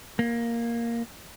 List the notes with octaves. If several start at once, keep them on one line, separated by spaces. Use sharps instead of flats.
A#3